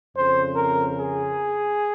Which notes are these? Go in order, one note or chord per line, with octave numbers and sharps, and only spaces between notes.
F2 C#3 C5
A#4
G#4